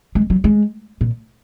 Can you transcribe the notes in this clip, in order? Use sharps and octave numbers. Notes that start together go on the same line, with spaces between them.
G#3
F#3
G#3
A#2